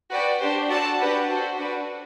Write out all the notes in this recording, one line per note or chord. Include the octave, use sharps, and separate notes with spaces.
F#4 B4 D5 G5
D4 G4 C5
F#4 A4 D5 A5
D4 G4 B4 F#5
F#4 A4 C5
D4 F#4 B4 D5